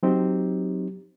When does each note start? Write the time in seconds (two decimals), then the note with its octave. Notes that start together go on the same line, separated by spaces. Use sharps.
0.03 F#3 C4 D#4 G4